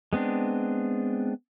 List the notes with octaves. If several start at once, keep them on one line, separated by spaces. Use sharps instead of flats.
G#3 B3 C4 D4